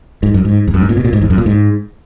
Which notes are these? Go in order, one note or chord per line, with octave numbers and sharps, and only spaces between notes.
G#2
F#2
G#2
E2
F#2
G#2
A#2
B2
A#2
G#2
E2
F#2
A#2
G#2